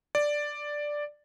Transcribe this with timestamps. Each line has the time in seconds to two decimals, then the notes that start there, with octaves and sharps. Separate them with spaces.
0.15 D5